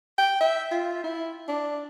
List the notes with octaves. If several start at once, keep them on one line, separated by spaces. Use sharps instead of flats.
G5
E5
F4
E4
D4